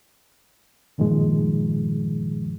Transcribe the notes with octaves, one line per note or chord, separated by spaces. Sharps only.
G2 A#2 D#3 F3 G#3